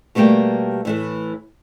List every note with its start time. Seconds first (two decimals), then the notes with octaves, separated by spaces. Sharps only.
0.15 B2 G3 A3 A#3 G4 A#4
0.85 A2 E3 A3